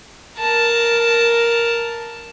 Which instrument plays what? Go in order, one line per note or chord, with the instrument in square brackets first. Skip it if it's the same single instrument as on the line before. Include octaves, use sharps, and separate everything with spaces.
[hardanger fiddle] A#4 A5